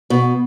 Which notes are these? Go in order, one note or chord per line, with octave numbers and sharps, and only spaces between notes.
B2